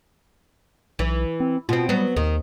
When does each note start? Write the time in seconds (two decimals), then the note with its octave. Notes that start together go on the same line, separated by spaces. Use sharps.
0.99 B1 E3
1.40 C4
1.69 B2 C4 F4
1.89 F#3 G3 B3
2.16 D#2 D#3